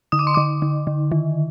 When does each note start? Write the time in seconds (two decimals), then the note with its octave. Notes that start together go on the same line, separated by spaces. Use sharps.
0.12 D3 D#6
0.19 D6
0.27 C6
0.34 D3 D6
0.62 D3
0.87 D3
1.12 D#3